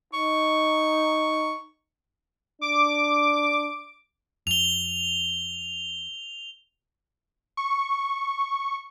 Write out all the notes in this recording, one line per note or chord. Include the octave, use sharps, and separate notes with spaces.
D#4 C#6
D4 D6
F2 F7 G7
C#6